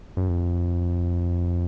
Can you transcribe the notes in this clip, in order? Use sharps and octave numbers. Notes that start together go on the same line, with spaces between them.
F#2
F2